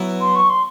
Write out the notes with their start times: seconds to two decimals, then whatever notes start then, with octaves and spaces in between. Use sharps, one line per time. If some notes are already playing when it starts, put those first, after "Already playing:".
Already playing: F#3 B3 E4
0.21 C6
0.36 C#6
0.50 C6